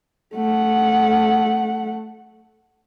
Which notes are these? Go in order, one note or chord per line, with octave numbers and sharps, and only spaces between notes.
A3 F#5